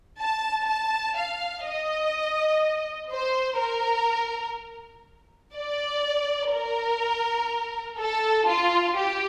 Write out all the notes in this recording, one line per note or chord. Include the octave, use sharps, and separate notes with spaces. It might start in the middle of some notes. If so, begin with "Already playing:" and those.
A5
A5
F5
D#5
C5
A#4
D5
A#4
A4
F4
G4